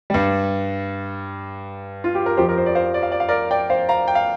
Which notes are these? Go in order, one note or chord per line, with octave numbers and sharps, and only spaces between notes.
G2 G3
F4
G4
A#4
F2 F3 G4 C5
A#4
C5
D5
C5 F5
D5
F5
D5
F5
A#4 D5
D5 G5
C5 F5
F5 A#5
G5
F5